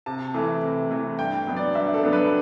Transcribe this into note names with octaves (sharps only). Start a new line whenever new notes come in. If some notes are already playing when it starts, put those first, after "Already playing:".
C3 A5
E3 A3 E4
C3
E3 A3 E4
G2 G5
F#3 B3 D4
D5
G2 E5
A4
F#3 B3 D4
B4